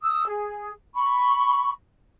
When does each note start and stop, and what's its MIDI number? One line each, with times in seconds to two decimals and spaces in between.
0.02 0.25 87
0.02 0.25 88
0.26 0.70 68
0.95 1.70 83
0.95 1.70 85